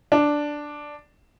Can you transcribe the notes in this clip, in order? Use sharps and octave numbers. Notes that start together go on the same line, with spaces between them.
D4